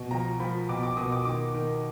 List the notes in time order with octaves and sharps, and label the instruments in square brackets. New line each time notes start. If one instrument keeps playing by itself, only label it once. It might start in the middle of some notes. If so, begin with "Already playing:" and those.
Already playing: [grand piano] B2
F3 A#5
F3 B5
B2 D6
D6
B2 D#6
D6
D#3 D6
D#3